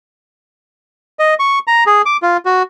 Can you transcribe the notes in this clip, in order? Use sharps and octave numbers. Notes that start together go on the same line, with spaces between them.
D#5
C#6
A#5
G#4
D6
F4
F#4